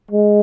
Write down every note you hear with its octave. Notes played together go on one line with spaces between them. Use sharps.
G#3